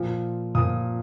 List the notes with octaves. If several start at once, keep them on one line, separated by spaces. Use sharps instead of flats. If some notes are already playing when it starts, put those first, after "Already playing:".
Already playing: A#2 F3
A#2 F3 D#6